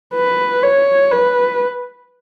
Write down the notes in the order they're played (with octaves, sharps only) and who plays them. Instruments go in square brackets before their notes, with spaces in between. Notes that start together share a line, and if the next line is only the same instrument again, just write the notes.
[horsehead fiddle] B4
C#5
B4